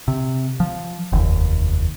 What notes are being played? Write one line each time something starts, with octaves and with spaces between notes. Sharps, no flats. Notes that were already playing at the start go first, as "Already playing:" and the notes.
C3
F3
F1 D#2